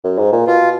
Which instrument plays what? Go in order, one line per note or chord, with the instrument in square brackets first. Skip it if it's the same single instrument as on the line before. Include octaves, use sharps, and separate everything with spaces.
[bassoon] F#2
G#2
A#2
[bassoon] B2 [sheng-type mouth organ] F4